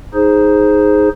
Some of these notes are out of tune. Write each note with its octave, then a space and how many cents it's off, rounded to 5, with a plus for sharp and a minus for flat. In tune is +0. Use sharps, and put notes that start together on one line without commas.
D#4 +0 G#4 +0 C5 +0